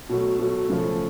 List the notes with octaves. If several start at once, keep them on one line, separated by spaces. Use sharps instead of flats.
B2 F#3 A3
B2 F#3 A3
C#3 F3 A3